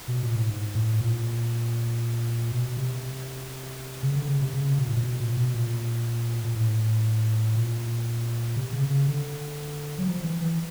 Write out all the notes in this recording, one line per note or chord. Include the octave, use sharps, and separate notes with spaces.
B2
A#2
A2
G#2
A2
A#2
B2
C3
C#3
D3
C#3
C3
C#3
B2
A2
A#2
B2
A#2
B2
A#2
A#2
A2
A#2
C3
C#3
C#3
D3
F#3
F3
E3
E3